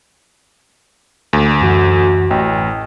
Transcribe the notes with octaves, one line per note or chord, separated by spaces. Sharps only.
D2
F#2 E3 F#4
A1 G5